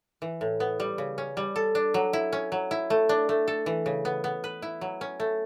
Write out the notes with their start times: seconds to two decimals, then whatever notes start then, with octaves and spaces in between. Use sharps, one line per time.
0.22 E3
0.41 A2
0.60 B3
0.80 G3
0.98 C#3
1.18 C#4
1.37 G3
1.56 A4
1.75 D4
1.94 F#3
2.13 E4
2.33 C#4
2.52 F#3
2.71 E4
2.90 A3
3.09 D4
3.29 A3
3.48 A4
3.66 E3
3.86 C#3
4.05 B3
4.24 B3
4.44 B4
4.62 E4
4.81 F#3
5.01 C#4
5.20 A3